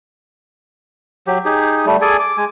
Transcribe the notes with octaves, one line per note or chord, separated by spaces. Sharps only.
F#3 G4
D#4 G4 G#4
G3 A3
G#4 A4 D5 G#5
D6
G#3 G#5